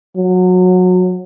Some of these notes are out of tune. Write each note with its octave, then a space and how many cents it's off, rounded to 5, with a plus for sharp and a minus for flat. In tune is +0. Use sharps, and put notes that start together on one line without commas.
F#3 -25